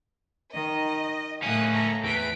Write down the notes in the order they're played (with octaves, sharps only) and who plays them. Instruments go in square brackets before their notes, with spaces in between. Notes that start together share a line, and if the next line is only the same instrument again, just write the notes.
[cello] D#3 [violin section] D#5
[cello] A2 [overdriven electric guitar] A#3 C#4 [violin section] D#6 F#6
[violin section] A4 A#5
[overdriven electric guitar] E2 E3 [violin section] B6 D7